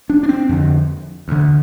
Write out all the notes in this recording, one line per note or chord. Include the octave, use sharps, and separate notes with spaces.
D4
D4
C4
F2 D3
D2 D3